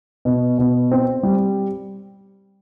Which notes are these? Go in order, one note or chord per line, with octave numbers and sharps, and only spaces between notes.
B2
B2
C4
G3